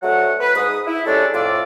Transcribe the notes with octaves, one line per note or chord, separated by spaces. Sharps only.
D2 F#3 A3 F#5
B4
G#2 D#6
E4
G3 G#3 C#4 D4 A4
F2 A2 F4 D5 D6 E6